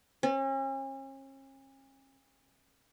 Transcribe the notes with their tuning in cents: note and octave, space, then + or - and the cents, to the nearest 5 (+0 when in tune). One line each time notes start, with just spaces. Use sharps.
C#4 -40